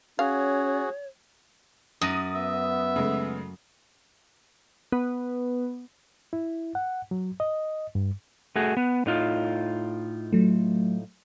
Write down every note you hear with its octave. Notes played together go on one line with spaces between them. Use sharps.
C#4 F#4 G#4 C#5 F5
F#2 D#6 A#6 D#7
B3 E5
C#3 G#3 A3
B3
E4
F#5
F#3
D#5
G2
A3 F#4 G#4
B3
A2 D#4 F4
F#3 A3